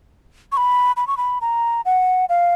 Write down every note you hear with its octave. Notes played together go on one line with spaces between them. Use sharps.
C#6
B5
B5
C#6
B5
A#5
F#5
F5